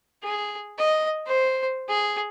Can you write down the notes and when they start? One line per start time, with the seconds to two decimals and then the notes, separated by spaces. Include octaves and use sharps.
0.23 G#4
0.78 D#5
1.26 C5
1.88 G#4